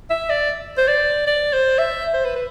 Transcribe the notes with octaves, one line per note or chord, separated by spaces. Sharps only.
E5
D5
C5
D5
D5
C5
E5
C5
B4
B4